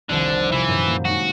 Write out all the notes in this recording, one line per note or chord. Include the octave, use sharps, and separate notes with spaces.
F1 C2 D3 D#3
C3 E3 F4 B5
F#2 A#2 G6
A#3
G#3 D#4 F#4